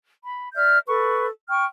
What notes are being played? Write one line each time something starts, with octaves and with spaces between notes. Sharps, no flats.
B5
D5 E5 F6 G6
A4 B4 C#6
G5 C#6 F6